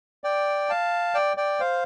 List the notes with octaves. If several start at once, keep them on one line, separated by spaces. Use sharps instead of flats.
D5 G5
F5 A5
D5 G5
D5 G5
C5 F5